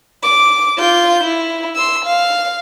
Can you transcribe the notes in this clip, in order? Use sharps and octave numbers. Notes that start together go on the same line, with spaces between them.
D6
F4 G6
E4
C6 E6
F5